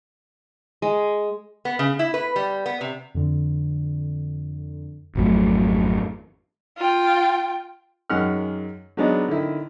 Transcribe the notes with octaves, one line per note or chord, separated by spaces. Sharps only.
G#3
B3
C#3
E4
B4
G3
B3
C3
F2 D3
G#1 F2 F#3 A3
F4 G5
F#2 D#3 G#3 F#5 F6
F#3 G#3 B3 D4 D#4
D3 D#3 E4